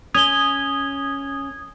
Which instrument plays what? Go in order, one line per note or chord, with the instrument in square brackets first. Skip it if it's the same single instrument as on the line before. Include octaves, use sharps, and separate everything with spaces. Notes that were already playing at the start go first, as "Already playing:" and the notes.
[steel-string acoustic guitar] C#4 [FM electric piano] D#6 G#6 [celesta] F7 G7